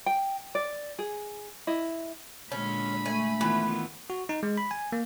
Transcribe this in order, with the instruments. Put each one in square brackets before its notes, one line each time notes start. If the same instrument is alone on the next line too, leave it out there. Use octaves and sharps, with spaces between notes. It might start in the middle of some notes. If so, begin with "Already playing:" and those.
[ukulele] G5
D5
G#4
E4 D#5
[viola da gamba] A#2 D3 G#3 [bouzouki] C#4 [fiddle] B5
[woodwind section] A3 [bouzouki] G#5
[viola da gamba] D#3 B3 F4 [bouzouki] E3
[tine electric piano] F#4
D#4
G#3
B5
G#5
A#3